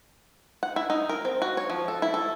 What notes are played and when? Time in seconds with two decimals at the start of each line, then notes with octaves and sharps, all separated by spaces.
0.63 F#5
0.76 E4
0.90 D#4
1.09 A#4
1.25 C4
1.42 F#4
1.57 C#5
1.70 F3
1.88 A4
2.02 E4
2.14 A4